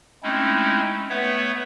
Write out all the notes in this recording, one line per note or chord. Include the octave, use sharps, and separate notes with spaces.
G#3 A3 C4 C#4 D#4 E4
A3 B3 B4 C#5 E5 F#5